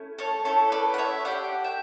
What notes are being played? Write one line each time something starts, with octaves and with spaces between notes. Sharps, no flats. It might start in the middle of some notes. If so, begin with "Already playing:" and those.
Already playing: A3 C#4 E4
A4 C#5
A3 C#4 E4 A4 C#5
B4 D5
F#5
C#5 E5
D4 G4 D5 F#5
E5 G5